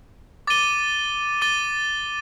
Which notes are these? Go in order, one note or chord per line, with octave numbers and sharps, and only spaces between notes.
D6 A6 D#7 G7
D6 A6 D#7 G7